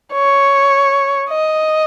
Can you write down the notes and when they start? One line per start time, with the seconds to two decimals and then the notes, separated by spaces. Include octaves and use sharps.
0.13 C#5
1.30 D#5